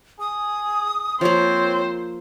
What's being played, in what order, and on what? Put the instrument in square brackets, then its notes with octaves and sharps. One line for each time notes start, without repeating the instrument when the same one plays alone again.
[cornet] G#4 [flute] D#6
[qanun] F3 A#3 [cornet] C4 [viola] C5 [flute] C#5